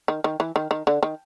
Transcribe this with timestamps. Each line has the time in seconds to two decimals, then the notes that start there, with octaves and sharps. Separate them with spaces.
0.08 D#3
0.24 D#3
0.40 E3
0.56 D#3
0.71 D#3
0.87 D3
1.03 D#3